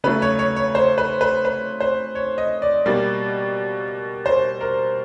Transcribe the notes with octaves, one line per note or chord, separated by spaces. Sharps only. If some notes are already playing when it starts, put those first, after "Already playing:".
C#3 F#3 A3 B4
C#5
C#5
C#5
C5
B4
B4
B4
C5
C#5
D#5
D5
B2 G3 A#3
C5
A#4